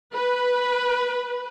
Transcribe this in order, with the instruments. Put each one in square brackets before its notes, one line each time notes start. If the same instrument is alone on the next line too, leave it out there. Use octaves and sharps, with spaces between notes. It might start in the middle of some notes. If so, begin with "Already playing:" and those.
[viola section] B4